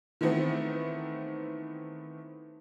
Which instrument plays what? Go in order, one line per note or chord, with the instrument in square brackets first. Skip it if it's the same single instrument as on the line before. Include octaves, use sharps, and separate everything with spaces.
[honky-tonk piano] D#3 E3 A3 B3 C4